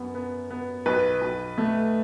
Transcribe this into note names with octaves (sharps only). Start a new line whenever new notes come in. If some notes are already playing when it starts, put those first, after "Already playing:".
Already playing: F#2 B3
B3
B3
B1 B4
B1
A3